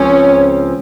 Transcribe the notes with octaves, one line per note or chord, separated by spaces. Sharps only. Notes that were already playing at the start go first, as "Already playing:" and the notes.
Already playing: C#2 C#3 F3 C4 C#4